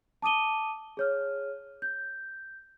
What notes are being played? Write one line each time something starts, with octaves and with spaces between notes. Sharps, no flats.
A5 D6 D#6 D#7 G7
G#4 C#5 F6
G6